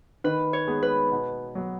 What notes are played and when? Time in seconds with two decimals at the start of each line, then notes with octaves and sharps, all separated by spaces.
0.24 D#3 B4
0.53 C#5
0.67 G#3 B3 G#4
0.83 B4
1.12 B2
1.55 F#3 B3